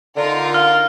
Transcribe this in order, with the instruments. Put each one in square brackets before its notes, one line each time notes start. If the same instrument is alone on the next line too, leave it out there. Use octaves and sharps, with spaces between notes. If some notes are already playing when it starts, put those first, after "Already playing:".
[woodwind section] D3 [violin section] D#4 F4 A#4
[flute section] F5 [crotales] F6